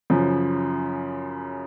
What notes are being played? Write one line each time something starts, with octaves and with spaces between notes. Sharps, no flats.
F#2 C#3 F3